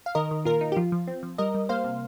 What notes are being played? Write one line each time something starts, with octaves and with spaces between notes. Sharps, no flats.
F5
D#3 A#4 D#5
D#3
A#2 F4 A#4
D#4
G4
F3 F4
F3
C4
F3
G3 A#4 D#5
G3
A#3 C5 F5
C3